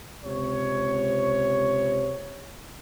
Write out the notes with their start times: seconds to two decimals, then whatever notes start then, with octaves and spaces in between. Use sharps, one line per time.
0.23 C#2 C3 C#5